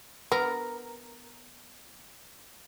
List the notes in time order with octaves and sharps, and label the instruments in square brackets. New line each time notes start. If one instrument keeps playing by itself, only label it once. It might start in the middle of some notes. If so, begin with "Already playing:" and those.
[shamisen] B3 [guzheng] A#4